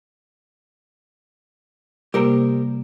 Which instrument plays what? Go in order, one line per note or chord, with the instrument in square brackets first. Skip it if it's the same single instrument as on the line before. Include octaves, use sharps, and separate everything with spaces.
[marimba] C3 A#3 [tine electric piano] G3 [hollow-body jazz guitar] G4 A#4 C5